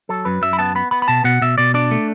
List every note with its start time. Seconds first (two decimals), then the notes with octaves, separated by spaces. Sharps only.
0.09 F#3 A4
0.25 F#2 B4
0.42 F#2 E5
0.53 B5
0.59 B3 A5
0.75 B3 B5
0.91 B3 B5
1.02 B5
1.08 B2 A5
1.24 B2 F#5
1.42 B2 E5
1.58 B2 D5
1.74 D4 D5
1.91 A3